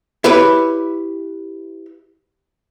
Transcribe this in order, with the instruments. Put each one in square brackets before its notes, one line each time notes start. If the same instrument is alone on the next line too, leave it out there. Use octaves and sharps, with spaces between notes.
[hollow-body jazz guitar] E4 G4 B4 C#5 B5